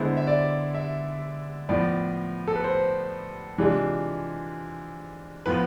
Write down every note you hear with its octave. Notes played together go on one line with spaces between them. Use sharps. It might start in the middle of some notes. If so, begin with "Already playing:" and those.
Already playing: D3 G#3 B3 E4 C5
E5
D5
E5
A2 F3 B3 D5
A4
B4
C5
C3 E3 G#3 D4 F4
A2 F3 B3 F4 B4